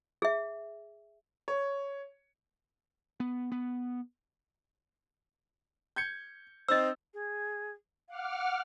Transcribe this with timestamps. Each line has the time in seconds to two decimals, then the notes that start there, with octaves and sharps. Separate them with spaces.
0.22 G#4 E5
1.48 C#5
3.20 B3
3.52 B3
5.96 G6 G#6 C#7
6.68 C4 D#4 C5 D#5 E6
7.13 G#4
8.08 F5 F#5 D6 F6